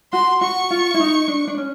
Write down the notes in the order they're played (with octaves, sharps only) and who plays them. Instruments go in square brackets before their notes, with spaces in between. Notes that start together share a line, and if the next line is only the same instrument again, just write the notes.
[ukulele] F#4 [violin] C6
[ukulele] F#4 [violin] C#6
[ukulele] F4
E4
D#4
D4
D4
C#4